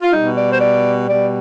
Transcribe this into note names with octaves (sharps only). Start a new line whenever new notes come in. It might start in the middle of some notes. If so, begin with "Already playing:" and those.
F4
B2 G3 D#4
D5
C5
D5
B2 G3 D5